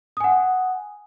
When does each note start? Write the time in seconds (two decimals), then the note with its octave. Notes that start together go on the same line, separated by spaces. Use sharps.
0.17 D#6
0.20 G#5
0.24 F#5